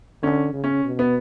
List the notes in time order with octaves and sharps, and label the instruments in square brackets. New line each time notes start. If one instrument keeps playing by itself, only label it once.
[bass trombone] D3 [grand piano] C#4
[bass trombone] C#3
[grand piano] C#4
[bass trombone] B2
[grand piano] B3